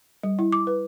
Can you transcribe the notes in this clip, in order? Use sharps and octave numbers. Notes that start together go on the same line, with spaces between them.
G3
E4
D6
B4